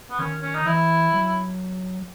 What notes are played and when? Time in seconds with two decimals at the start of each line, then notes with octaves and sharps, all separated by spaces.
0.10 B3
0.19 D#3 C#4
0.42 C#4
0.55 D#4
0.66 E3 E4
1.14 F#3